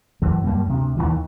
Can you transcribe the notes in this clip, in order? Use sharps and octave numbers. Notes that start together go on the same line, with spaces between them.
F#2 E3
F#2 G3 A#3
D2 C3
D#2 C3 D#3 E3